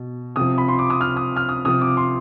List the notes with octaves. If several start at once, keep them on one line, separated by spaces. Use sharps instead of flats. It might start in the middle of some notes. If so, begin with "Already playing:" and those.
Already playing: B2
C3 F3 D#6
B5
C6
D6
D#6
F6
D#6
F6
D#6
C3 F3 D#6
D6
C6